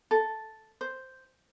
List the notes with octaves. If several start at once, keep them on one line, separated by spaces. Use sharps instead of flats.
A4
C5